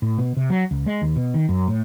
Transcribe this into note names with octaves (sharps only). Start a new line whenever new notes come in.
A2
B2
C3
F#3
C#2
G#3
D#2
B2
D#3
F#2
A2